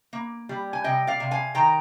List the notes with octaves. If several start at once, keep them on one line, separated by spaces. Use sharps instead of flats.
A#3
G3
G#5
C3 D#5 G5
D5 F5
C3
F5 G#5
D#3 G5 A#5